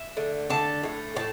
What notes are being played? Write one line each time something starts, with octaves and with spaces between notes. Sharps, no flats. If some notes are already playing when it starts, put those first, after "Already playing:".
Already playing: E5
D3 A3
D3 A3 A5
A2 A3
A2 A5